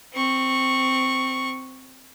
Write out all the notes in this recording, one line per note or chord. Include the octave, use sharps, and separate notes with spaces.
C4 C#6